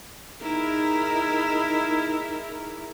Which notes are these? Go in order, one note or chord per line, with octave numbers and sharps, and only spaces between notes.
D#4 E4 G#4 A#4